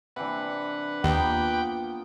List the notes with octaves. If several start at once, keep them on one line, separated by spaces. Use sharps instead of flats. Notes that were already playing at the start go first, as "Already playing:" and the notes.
C3 E3 D4 B4 F#5
D#2 F3 A#3 B3 G5